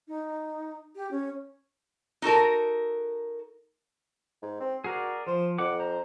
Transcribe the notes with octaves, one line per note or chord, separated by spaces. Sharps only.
D#4
G4
C#4
D#4 F#4 A4 A#4
G#2
C4
F#4 G#4 A#4 D5
F3 C5
F2 F#5 D6
C5 A#5